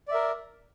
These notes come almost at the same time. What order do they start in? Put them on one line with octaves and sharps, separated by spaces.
D5 E5 A#4